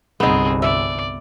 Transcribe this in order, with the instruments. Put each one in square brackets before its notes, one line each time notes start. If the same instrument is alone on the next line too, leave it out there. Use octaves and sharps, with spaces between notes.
[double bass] G1 C2 [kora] B3 D#4 [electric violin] C4 G#4
[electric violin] D5 [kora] E5